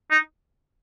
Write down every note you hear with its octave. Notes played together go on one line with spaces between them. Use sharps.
D#4